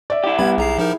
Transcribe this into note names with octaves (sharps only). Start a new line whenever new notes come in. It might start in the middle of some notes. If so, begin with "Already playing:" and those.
D5 E5
E4 G4
G3 B3 B5 G#6
B1 G#4 A#5 C7
F3 D#4 A#4